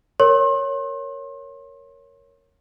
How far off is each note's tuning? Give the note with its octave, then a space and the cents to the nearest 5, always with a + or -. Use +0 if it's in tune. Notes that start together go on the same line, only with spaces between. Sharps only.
A#4 +0 C#5 +0 C6 +40